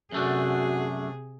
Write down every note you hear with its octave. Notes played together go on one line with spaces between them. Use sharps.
F#2 C3 A3 D4 F#4 G#4